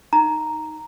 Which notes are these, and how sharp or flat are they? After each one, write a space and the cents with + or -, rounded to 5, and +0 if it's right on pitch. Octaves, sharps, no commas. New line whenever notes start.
D#4 +0 A#5 +0